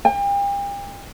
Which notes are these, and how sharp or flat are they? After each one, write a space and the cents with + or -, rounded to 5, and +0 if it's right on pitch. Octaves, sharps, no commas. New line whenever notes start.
G5 +40